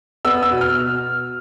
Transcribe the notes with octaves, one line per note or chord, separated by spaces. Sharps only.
B3 E6
E6
B2
F6